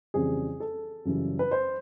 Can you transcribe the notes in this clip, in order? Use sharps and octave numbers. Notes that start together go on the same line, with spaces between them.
F2 C#3 E3 G3 G#4
A4
F#2 C#3 E3 G3
B4
C5